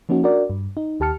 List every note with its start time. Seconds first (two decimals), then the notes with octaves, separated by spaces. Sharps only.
0.09 F3 A#3 C#4 D#4 F#4
0.23 D4 F#4 A#4 D5
0.50 G2
0.77 D#4
1.00 D#2 G4 A5 F6 C#7